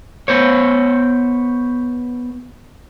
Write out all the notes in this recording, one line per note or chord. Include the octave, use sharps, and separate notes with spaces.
B3 C5 C#5